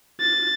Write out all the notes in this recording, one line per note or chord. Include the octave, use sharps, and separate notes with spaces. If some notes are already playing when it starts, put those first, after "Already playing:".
A6